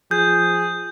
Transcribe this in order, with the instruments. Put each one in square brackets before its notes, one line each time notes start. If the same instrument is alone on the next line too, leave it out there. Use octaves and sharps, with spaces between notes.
[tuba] F3 [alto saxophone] G#4 [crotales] G6